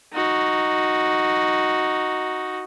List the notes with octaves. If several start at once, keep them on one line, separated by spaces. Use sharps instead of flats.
D#4 F#4